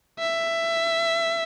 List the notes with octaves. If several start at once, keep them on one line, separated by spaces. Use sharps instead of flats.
E5